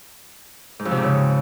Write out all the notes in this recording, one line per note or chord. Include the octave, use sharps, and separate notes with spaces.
G#2
F2
C3
G#2
C#3